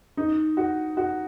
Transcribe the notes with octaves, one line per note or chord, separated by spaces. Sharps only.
D#4
F#4
F#4